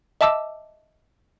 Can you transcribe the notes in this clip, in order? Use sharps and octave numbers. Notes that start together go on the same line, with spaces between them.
D#5 E5 A5 D6 E6